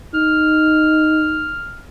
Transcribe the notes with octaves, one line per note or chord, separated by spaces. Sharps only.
D#4 F6